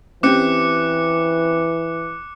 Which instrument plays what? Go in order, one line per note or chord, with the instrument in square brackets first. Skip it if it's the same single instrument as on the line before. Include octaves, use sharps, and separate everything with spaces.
[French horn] E3 [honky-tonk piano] C4 C#4 G4 [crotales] D6 F#6 C#7